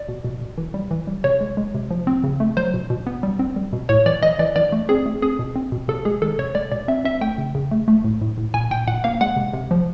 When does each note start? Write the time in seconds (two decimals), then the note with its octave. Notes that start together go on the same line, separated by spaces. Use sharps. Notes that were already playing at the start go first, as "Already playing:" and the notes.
Already playing: D5
0.09 B2
0.24 B2
0.41 B2
0.58 E3
0.74 G3
0.91 E3
1.07 G3
1.24 C3 C#5
1.41 G#3
1.57 G#3
1.74 C3
1.91 F3
2.07 C4
2.24 C#3
2.40 A3
2.57 F#3 C5
2.74 B2
2.90 B2
3.07 B3
3.23 G3
3.39 C4
3.56 G3
3.73 B2
3.89 A2 C#5
4.06 E3 D5
4.23 E3 D#5
4.39 E3 D5
4.56 E3 D5
4.72 A3
4.89 C4 G#4
5.06 A3
5.22 C4 G#4
5.39 B2
5.56 C4
5.72 B2
5.88 C3 A4
6.05 G#3 G#4
6.22 D#3 A4
6.39 C3 C#5
6.55 G#3 D5
6.72 B2 D5
6.88 C4 E5
7.05 C4 E5
7.21 A3 G5
7.38 C#3
7.55 C#3
7.71 A3
7.88 A3
8.04 A2
8.21 A2
8.38 A2
8.54 A#2 G#5
8.71 A#2 G5
8.88 A#2 F#5
9.04 A#3 F5
9.21 G#3 F#5
9.37 C3
9.53 C3
9.71 F3